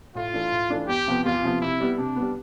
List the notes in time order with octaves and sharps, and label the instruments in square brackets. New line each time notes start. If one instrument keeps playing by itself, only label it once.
[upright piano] A2 [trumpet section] F4
[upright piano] E3 A3 D4
A2
E3 A3 D4
[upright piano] E2 [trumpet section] G4
[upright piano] C3 F3 B3
[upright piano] E2 [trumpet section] F4
[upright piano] C3 F3 B3
[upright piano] C3 [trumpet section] E4
[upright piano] G3 B3
[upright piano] C3 [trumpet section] D4
[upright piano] G3 B3